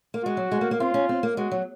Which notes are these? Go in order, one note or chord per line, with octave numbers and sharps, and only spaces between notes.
A#3
G#3 F#4
F#3
G#3
A#3
A#3
C4 F4
C#4
C4
A#3
G#3 F#4
F#3